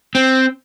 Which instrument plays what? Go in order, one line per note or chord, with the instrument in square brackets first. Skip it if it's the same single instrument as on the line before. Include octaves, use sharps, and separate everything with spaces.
[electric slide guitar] C4